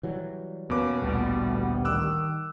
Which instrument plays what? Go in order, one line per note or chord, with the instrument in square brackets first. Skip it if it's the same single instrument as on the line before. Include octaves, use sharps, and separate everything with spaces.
[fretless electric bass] E3 F#3 G3
[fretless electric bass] E2 A#3 C#4 [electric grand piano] B2 D6 [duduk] B4
[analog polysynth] A1 D2 G3 [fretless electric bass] A#2 [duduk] B3
[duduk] D#3 [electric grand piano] D6 E6 F#6